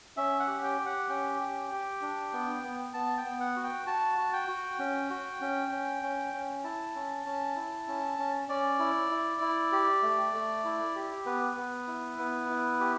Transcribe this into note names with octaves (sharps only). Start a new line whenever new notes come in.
C#4 E5
F#5
G4
G5
G4
F#5
C#4 G5
G4
G4
D4
B3
B3
B3 A5
G5
B3
F#5
F#4
G5
F#4 A5
F#4
G5
F#4
C#4
F#4
C#4
C#4
C#4
C#4
E4 A5
C#4
C#4
E4
C#4
C#4
C#4 D5
E4
E4
E4
G4
A3
A3
E4
G4
B3 B4
B3
E4
B3
E4
G4